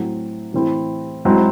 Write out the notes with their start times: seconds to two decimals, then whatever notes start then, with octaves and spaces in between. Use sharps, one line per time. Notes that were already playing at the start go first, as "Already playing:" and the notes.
Already playing: A2 F#3 C4
0.53 A2 E3 C4 E4
1.25 G#2 F#3 C4 E4